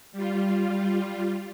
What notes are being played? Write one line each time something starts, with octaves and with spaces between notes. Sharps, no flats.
G3 F4